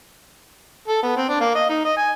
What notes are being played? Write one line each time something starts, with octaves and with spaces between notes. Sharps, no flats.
A4
B3
C4
D4
A#3
D#5
D#4
D#5
G#5